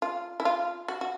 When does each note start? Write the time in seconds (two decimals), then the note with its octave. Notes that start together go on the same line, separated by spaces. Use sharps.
0.02 F4
0.40 E4
0.45 F4
0.88 F#4
1.01 F#4